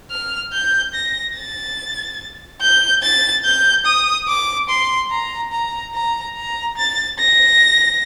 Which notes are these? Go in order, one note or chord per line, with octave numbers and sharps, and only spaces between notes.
F6
G6
A#6
A6
G6
A6
G6
D#6
D6
C6
A#5
A#5
A#5
A#5
A6
A#6